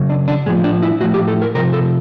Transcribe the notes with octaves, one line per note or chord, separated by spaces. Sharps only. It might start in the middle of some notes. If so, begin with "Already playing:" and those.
Already playing: C#3 F#3
D4
D4
A2 F3 G#3
D4
E4
A2 F3 F#4
G4
A4
A#4
C3 F3 A#4
A4